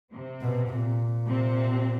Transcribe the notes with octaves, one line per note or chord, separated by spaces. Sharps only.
C3 C4
B2
A#2
C3 C4